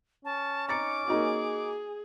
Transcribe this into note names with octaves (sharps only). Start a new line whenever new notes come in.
C#4 A5
D#4 A#5 D6 A6 C#7
A#3 D#4 F#4 G#4